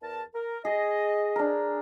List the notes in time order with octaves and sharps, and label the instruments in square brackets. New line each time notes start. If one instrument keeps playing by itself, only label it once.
[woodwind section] E2 A#4 A5
A#4
[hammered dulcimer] G#4 [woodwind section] D#5
[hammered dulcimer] D4 A#4